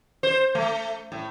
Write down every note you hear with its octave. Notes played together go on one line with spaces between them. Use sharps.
C5
A3
A2